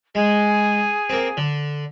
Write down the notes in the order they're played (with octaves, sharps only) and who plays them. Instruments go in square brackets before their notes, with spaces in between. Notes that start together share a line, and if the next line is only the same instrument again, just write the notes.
[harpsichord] G#3 [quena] G#4
[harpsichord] A#3 C4
D3